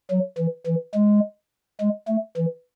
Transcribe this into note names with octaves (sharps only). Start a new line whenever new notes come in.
F#3
E3
E3
G#3
G#3
A3
E3